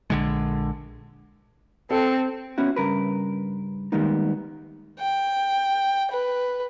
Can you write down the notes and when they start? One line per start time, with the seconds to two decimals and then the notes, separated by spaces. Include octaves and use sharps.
0.10 A#1 D3 G#3
1.91 C4 A4
2.58 B3 C#4 E4 F#4
2.76 G2 C#3 A#4 B4
3.92 D#3 G3 G#3 A#3 B3 D#4
4.99 G5
6.11 B4